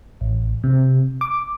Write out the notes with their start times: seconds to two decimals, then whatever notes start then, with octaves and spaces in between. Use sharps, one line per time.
0.21 A1
0.64 C3
1.21 D6